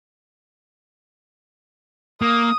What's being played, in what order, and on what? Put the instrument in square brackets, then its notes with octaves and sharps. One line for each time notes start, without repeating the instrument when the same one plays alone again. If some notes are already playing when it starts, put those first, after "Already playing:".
[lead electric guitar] A#3 [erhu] D#6